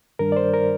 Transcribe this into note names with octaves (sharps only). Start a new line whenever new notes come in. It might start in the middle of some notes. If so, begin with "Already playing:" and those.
G2 D#3 G3 D4 A#4
D5
C5
A#4